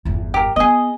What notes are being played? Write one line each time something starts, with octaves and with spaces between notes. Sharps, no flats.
G1 E2
G4 A#4
B3 G#4 D#5